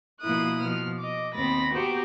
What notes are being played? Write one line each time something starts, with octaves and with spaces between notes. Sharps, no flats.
B2 F3 A#3 E4 D#6 F#6
B2 F3 F6
D#5 D6
D#2 B3 C4 B5 A6 A#6
B3 F#4 G4 C5 A#5 D6